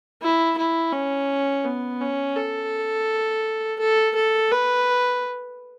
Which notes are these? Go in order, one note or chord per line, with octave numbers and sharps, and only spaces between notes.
E4
E4
C#4
B3
C#4
A4
A4
A4
B4